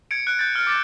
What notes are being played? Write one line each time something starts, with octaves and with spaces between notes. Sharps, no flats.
G#6 C#7 D7
F#6 D7
G6 A6
F6
D6 A6